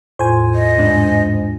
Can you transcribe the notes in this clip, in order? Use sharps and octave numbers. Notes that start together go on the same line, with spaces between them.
E2 A2 F4 C5 G#5
D#5
C#2 G#2 D4